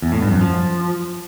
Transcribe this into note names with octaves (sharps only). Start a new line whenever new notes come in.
E2
A2
G2
F#2
F3